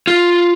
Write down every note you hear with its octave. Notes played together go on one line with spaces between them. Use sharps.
F4